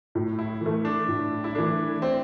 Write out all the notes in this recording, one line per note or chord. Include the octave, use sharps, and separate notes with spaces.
A2
E4
E3 A3
D4
A2
E4
E3 A3 D4
C4